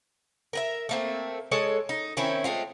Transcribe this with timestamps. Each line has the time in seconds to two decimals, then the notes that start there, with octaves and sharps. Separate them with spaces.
0.53 A#4 B4 E5
0.89 A3 A#3 C4
1.52 G#3 A4 C#5 D#5
1.89 D#4
2.17 D#3 C4 C#4 E4
2.44 G#3 A3 C4 F4